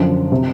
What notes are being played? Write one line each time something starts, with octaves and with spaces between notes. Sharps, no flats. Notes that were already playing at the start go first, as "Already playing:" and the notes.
Already playing: F#2 D3 F3
C3